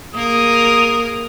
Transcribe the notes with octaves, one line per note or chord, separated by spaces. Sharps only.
A#3 G#4 A#4 D#6